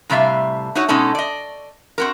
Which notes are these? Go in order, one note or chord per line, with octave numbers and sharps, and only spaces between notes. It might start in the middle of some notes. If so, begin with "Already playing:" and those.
A2 C3 G3 E5 F5
D#4 E4 F#4 C#5
B2 G#3 C#4 D#4 A4
D5 D#5
C4 F#4 A#4